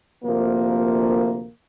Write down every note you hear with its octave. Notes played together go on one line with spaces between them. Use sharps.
D2 C3 F3 A#3